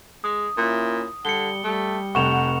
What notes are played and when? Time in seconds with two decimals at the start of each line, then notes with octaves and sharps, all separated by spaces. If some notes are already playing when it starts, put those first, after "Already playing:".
0.24 G#3 D#6
0.57 A#2 C#4 E4
1.25 D3 G3 C#7 G7
1.64 G3 A3
2.15 F1 G2 F#5 C#6 E7 F7